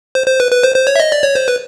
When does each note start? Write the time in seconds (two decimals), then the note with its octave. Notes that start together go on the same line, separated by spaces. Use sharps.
0.15 C5
0.27 C5
0.40 B4
0.52 B4
0.63 C5
0.76 C5
0.87 C#5
0.96 E5
1.00 D#5
1.12 D5
1.23 C#5
1.35 C5
1.48 B4